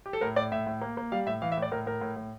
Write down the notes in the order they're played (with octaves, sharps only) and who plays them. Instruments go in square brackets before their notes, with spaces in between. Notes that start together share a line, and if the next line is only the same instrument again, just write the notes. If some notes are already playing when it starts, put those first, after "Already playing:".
[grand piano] G4
A4
A2 A#4
A2 D5
A2 E5
A2
A#3
A#3
G3 F5
A2 E5
E3 F5
E5
A2
D5
A2 A#4
A2 A#4
A2
A2